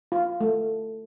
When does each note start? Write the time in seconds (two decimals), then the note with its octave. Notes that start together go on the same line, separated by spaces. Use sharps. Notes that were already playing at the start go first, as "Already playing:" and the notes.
0.12 F4
0.41 A3